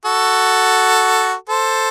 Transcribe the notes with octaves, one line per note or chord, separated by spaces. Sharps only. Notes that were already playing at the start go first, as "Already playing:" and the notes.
F#4 A4
A4 C5